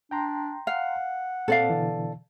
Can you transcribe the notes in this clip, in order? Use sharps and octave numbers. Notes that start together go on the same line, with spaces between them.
D4 G5 A#5 C6
F5 F#5
A#2 C4 A4 D5 F5
B2 D3 E3